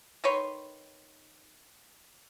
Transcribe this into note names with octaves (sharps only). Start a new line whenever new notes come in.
D#3 B4 C#5 C6